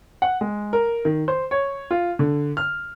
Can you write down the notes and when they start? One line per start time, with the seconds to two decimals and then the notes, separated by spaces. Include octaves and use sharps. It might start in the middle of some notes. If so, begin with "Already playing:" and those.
0.22 F#5
0.41 G#3
0.73 A#4
1.05 D#3
1.28 C5
1.51 C#5
1.91 F4
2.19 D3
2.57 F6